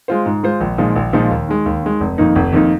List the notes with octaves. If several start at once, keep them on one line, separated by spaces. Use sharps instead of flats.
G#3 F4 C5
G#2
G#3 F4 C5
A#1
A#2 F3 G#3 D#4
A#1
A#2 F3 G#3 D#4
D#2
D#3 G#3
D#2
D#3 G#3
F1
F2 D#3 A#3 D#4
F1
F2 D#3 A#3 D#4